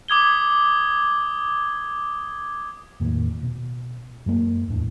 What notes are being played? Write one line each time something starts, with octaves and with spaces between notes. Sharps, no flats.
D6 D#6 G#6 G7
E2 A2 D#3 A#3
B2
F#2 G#3 A#3
D1 E2 A2 D4